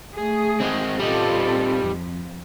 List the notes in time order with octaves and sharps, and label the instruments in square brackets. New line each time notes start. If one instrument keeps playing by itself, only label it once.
[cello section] A3 G#4
[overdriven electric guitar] G#3 C4
[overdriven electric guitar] G3 D#4 [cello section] C4 F4 A4
[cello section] F2